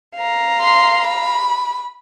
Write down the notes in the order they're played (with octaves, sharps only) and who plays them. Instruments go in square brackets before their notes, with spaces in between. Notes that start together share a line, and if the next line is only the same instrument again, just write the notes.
[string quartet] F5 A#5
[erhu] C6
B5